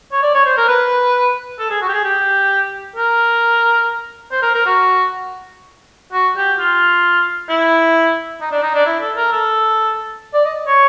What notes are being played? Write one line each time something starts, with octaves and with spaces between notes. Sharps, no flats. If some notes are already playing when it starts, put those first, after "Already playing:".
C#5
D5
C#5
C5
A#4
B4
A4
G#4
F#4
G4
G#4
G4
A#4
C5
A#4
A#4
F#4
F#4
G4
F4
E4
D#4
D4
D#4
D4
E4
A4
A#4
A4
D5
D#5
C#5